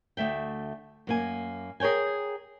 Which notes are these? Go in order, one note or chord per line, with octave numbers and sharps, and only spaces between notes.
D2 A3 E5 G5
F#2 A#3 G#5
G#4 A#4 C#5 G5 G#5